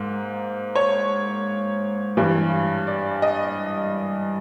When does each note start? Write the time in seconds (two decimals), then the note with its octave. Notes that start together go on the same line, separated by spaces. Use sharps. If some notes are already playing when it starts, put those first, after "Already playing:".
Already playing: G#2 A#3
0.76 C#5
2.17 G2 E3 G3
2.87 D5
3.22 D#5